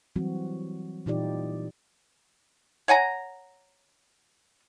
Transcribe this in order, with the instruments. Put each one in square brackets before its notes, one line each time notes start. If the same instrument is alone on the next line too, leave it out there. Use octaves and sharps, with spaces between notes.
[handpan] E3 F#3 G3 C4 F#4
A#2 E3 D#4 F4 G4 D5
[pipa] C#5 F#5 G#5 A#5